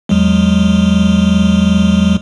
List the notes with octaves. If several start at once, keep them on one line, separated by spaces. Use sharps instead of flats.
E2 F#3 G#3